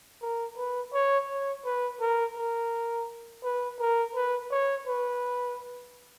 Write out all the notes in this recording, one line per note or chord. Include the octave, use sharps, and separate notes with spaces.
A#4
B4
C#5
C#5
B4
A#4
A#4
B4
A#4
B4
C#5
B4